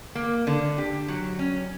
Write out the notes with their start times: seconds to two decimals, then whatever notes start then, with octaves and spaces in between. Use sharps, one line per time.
0.15 A#3
0.47 D3
0.78 G4
1.08 F#3
1.39 C#4